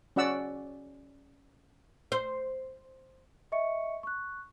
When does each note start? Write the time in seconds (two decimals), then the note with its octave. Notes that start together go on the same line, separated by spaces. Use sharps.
0.16 C#4 F#4 D5 F#5 E6
2.12 C5
3.52 D#5 E5 C#6 C#7
4.03 C#6 F#6